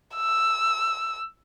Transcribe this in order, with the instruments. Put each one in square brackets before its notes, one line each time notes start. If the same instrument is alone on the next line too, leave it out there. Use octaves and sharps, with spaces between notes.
[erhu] E6